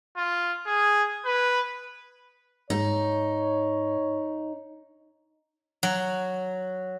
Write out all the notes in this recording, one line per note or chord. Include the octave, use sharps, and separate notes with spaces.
F4
G#4
B4
G#2 D#4 C#5
F#3